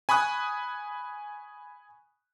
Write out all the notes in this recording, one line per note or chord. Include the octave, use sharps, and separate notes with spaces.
G#5 B5 C#6 D#6 F#6